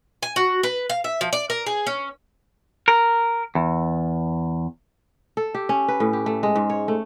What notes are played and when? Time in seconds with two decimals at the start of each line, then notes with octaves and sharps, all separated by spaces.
0.23 G#5
0.36 F#4
0.63 B4
0.90 F5
1.04 E5
1.21 F3
1.33 D5
1.50 A#4
1.66 G#4
1.87 C#4
2.88 A#4
3.55 E2
5.37 A4
5.54 G4
5.69 C#4
5.88 B4
6.00 A2
6.13 G4
6.26 A3
6.43 G#3
6.55 G#2
6.70 C#5
6.88 A3